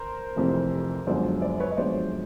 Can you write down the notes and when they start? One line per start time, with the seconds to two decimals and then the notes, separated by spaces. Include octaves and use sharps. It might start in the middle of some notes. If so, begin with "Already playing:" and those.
Already playing: A#4 C5
0.36 F1 F2 C3 E3
1.07 G1 F#2 D3 F3 G#3 C5 D5
1.42 C5 D5
1.60 B4 C#5
1.71 D#5
1.77 G1 F#2 D3 F3 G#3 C5 D5